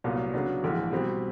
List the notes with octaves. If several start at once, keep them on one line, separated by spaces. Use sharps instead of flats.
C2 A#2 F#3 B3
C#3 F#3 B3 D4
A#1 G#2 E3
B2 G3 C4